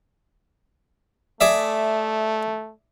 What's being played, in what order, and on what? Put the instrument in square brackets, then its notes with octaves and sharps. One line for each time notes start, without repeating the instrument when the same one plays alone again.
[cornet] A3 [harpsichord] G#4 D5 E5